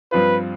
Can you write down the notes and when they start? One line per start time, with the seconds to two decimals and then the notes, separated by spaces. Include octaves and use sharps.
0.12 G2 F3 C4 F4 B4